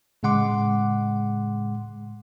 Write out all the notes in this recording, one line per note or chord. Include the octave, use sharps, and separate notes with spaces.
A2 C#3 G#3 F#5 C6 D6